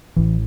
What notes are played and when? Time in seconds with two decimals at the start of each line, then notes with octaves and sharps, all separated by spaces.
0.16 A1 A2 E3